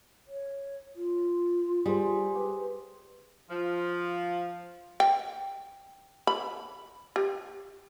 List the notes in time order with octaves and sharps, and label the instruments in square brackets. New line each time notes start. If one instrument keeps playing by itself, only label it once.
[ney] C#5
F4
[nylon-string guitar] G3 [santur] G#4 C5
[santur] G4 [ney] B4
[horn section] F3
[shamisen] G5
B5
G4